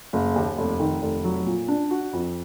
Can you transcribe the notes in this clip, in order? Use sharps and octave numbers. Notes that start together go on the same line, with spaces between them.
F#1
D#2
F1
D#3
F1
F#3
A#2
D4
F#4
F2